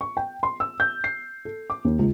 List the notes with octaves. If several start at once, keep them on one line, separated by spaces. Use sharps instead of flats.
C#6
G5
C6
E6
G6
C7
A4
D6
D#2
C#2